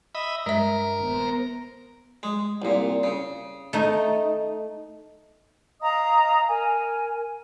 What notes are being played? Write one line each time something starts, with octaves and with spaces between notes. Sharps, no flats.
D#5 E5 B5
G2 G#3 A#4 E5
D#1 B3 C5
G#3
C2 A#2
C#3
A3 D#4
D#5 F5 A#5 D#6
A#4 G#5